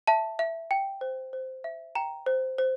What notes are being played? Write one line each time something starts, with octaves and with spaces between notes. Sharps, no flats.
E5 A5
E5
G5
C5
C5
E5
G5 A#5
C5
C5